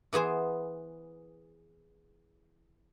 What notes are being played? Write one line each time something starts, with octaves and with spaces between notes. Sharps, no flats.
E3 B3 G#4 C5